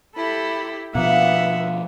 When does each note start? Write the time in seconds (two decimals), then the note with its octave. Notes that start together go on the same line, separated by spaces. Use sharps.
0.16 E4 G4 A4 B5
0.95 B2 F3 A#3 B3 E5 F#5